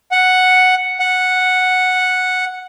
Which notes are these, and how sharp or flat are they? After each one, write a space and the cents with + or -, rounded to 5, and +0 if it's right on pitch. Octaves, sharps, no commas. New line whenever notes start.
F#5 +0
F#5 -5